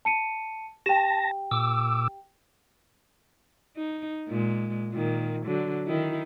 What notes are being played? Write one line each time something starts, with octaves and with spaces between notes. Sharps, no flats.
A5 C#7 D#7
G4 G5 A5 A#6
A#2 D6 E6
D#4
A#2 G#3
A#2 D#3
D3 F#3
D#3 D#4 E4